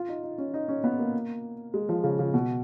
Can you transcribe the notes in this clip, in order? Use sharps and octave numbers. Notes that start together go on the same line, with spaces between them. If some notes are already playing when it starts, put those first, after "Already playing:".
Already playing: F4
D#4
D#4
C#4
D#4
C#4
B3
A#3
G#3
F3
C#3
C#3
B2